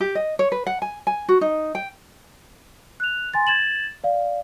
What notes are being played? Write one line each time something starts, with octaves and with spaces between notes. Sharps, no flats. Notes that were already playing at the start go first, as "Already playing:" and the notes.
G4
D#5
C#5
B4
F#5
G#5
G#5
F#4
D#4
G5
F#6 F7
G#5 C6 A6
G#6 A6 E7 F#7
D5 F5